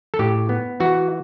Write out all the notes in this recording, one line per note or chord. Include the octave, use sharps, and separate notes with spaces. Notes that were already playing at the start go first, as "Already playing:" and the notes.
A4
A2 G4
B3
E3 F#4